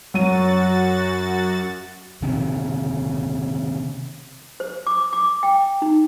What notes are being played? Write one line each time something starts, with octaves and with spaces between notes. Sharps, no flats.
F#2 F#3 F#4 A6 D#7
C3 D#3 C4 C#4
C5
D6
D6
G5
D#4